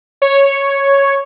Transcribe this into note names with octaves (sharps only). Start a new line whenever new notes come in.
C#5